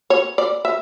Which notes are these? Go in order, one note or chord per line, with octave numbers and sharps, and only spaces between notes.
C#5
D5
E5